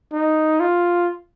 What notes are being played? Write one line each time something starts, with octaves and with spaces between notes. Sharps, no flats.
D#4
F4